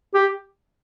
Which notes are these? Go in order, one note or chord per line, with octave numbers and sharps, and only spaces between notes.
G4